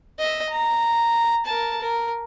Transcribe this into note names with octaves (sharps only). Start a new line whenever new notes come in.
D#5 E5
A#5
A#4 A5
A#4